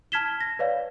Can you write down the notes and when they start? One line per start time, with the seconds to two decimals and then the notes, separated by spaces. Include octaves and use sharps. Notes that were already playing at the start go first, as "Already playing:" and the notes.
0.12 A5 F6 G#6 B6 E7 G7
0.40 A#6
0.59 B4 C#5 D5 F5